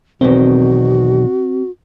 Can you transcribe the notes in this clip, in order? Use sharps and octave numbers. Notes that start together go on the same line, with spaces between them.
B1 E2 B2 D#3 C4 F#4